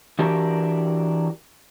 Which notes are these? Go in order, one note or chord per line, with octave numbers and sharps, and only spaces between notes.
E3 D4 F#4 G4 A#4